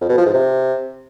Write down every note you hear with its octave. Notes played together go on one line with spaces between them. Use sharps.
F2
B2
F3
G#2
C3